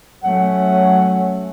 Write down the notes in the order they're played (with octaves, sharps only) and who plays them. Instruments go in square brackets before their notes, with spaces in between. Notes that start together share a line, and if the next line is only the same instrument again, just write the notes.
[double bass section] F#3 A3 C#4 [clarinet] F#5